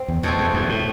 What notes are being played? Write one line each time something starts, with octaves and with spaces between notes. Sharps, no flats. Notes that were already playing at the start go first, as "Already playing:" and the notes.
Already playing: C4
E2
E2 B2 A3 C4
E2
E2 G2
A2